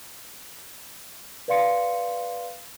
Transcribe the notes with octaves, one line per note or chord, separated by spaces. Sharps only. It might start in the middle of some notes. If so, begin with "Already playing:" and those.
B4 D5 F5 C6 C#7